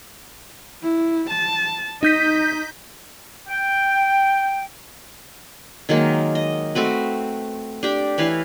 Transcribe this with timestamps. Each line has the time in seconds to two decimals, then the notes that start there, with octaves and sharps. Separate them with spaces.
0.83 E4
1.30 A5
2.03 D#4 D#5 G6 B6
3.48 G5
5.89 D#3 F#3 G#3 A#3
6.35 D#5
6.75 A3 C4 F#4 B4
7.83 D4 G4
8.18 E3 B4 C#5 F5